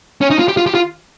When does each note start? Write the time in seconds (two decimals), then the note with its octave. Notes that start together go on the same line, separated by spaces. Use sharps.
0.21 C#4
0.30 D#4
0.39 F4
0.48 G4
0.57 F4
0.66 G4
0.75 F4